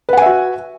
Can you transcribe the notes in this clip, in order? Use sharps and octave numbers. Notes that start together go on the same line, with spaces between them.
F#4 B4 E5 F#5 G#5